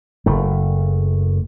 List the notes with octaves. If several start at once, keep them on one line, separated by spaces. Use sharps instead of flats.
F#1 A3